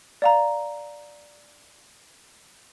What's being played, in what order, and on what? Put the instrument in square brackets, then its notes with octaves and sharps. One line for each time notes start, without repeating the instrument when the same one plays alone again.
[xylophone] D5 F5 A#5